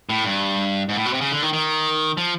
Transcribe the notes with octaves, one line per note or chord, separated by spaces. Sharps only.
A2
G2
G#2
A2
B2
C3
C#3
D3
D#3
D#3
F3